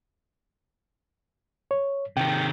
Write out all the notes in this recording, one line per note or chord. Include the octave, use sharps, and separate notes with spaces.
C#5
C3 D#3 G5